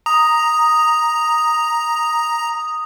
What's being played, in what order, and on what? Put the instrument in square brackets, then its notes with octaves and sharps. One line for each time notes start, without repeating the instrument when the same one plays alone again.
[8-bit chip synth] A#5 [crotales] D#6